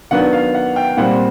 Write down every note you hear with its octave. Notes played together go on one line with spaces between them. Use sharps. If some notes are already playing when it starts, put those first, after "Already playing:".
D#3 F#3 B3 D4 F#5
F5
F#5
G5
A#2 G3 C4 F#5